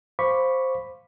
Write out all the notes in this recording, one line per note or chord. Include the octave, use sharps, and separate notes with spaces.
C5 F5 B5 C#6 D6 B6